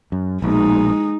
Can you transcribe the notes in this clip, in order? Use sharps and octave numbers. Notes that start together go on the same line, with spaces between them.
F#2
A#1 B2 G#3 D#4